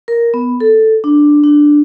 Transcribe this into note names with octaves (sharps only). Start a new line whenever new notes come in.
A#4
B3
A4
D4
D4